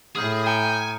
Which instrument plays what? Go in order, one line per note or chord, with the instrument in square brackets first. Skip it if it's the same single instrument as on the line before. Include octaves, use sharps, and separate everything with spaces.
[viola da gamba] A2 [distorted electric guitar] G#4 [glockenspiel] D#6 F6 G6
[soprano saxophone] G5 [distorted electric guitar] G#5 [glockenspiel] A#5 C#7 D7